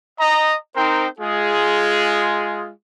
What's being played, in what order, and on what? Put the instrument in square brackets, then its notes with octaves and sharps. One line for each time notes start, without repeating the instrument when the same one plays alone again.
[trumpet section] D#5 A#5
C4 D#4 A#4 C5 G5
G#3 F4 G#4